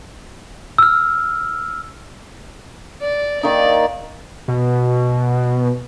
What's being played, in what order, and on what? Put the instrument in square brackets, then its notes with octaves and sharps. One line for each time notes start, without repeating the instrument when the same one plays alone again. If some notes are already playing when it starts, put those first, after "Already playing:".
[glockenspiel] E6 F6
[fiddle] D5
[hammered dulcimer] D#3 A#3 D#4 [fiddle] D5
[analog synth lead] B2